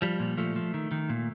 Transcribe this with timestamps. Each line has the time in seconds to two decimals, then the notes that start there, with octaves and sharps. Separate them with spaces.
0.02 F3 G3
0.20 A#2
0.37 F3 A3
0.56 F3
0.74 D#3
0.91 D#3
1.09 A#2